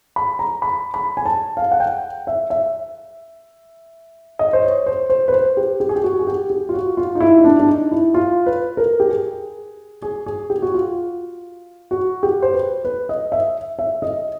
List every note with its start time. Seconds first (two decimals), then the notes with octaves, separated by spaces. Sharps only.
0.16 B5
0.39 A#5
0.62 B5
0.94 B5
1.17 G#5
1.26 A5
1.57 F5
1.72 F#5
1.80 G5
2.27 E5
2.50 E5
4.39 D#5
4.53 C5
4.63 C#5
4.86 C5
5.10 C5
5.28 B4
5.33 C5
5.57 G4
5.80 G4
5.89 G#4
5.96 G4
6.03 F#4
6.19 G#4
6.27 G4
6.50 G4
6.69 F4
6.74 F#4
6.97 F4
7.15 D#4
7.20 E4
7.38 D#4
7.44 D4
7.60 D4
7.69 D#4
7.91 E4
8.14 F4
8.46 B4
8.77 A#4
9.00 G4
9.09 G#4
10.02 G#4
10.26 G#4
10.50 G4
10.62 F#4
10.74 F4
11.91 F#4
12.23 G4
12.42 C5
12.54 B4
12.85 B4
13.09 D#5
13.32 E5
13.79 E5
14.02 D#5